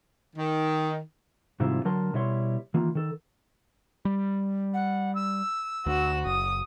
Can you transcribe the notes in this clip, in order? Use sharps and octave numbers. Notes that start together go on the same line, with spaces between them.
D#3
G#2 C3 D#3 G3 E4 F4
D3 F#3 A#4 A5 C6
B2 G3 E4 C#5 C6
D#3 E3 A#3 F4
D#3 A4
G3
F#5
E6
D2 F#4 E7
F#1 D#6